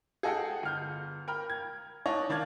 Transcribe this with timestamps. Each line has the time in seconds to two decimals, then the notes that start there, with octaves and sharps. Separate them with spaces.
0.23 G#4 A4 D#5 F#5 G5
0.63 G1 F6 G6
1.28 A#4 G5 B5 F6
1.50 G#6
2.06 D4 D#4 C#5 D#5
2.29 D#3 D4 D5 F5 G#6